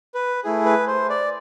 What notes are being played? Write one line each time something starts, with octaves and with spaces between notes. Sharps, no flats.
B4
A3 E4 G#4
B4
C5
D5